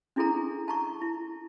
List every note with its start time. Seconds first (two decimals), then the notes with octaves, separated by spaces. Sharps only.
0.16 C#4 D4 E4 G#4 A4 A#5
0.68 A5 A#5 C#6
1.02 E4